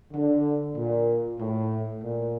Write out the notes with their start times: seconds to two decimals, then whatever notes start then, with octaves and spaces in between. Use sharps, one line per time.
0.13 D3
0.76 A#2
1.39 A2
2.03 A#2